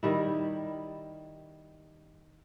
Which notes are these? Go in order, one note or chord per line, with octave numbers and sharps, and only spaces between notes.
D#3 G3 E4